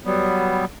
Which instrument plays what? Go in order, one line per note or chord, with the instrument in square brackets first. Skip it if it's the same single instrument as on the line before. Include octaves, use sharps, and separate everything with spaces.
[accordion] F#3 G3 B3